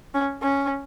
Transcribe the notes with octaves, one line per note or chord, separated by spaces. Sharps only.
C#4
C#4